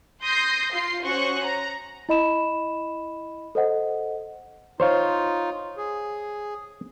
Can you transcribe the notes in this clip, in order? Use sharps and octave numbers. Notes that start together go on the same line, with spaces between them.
C6 D#6 G6 A#6 C7
F4 C6 C7
C#4 F#4 C5 C#6 D#6 F#6
A#5
E4 D#5 B5 E7
A4 C5 D#5 F#5
D#4 F4 C5 C#5 F5
G#4